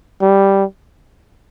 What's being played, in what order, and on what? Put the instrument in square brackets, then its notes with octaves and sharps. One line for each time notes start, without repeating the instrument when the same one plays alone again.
[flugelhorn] G3